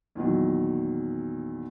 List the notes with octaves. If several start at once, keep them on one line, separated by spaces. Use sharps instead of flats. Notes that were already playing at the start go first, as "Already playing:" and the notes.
E2 A#2 D#3 F#3